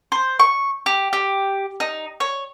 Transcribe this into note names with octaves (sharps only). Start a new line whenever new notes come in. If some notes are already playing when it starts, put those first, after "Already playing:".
C5
C#6
G4
G4
D#4
C#5